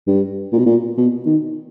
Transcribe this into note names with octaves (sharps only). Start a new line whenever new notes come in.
G2
A#2
B2
A#2
B2
D#3